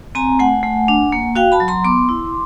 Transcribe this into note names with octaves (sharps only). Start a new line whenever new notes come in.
C4 G#5 A#5
A3 F#5 G#5
A3
D4
A#3
F#4 F5 G5
A5 B5
F#3
A#5 C6
B3 C6 D6
E4